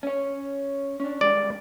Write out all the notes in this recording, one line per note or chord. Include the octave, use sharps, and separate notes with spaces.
C#4 C#5
C#4 D4
D#3 G3 G#3 D5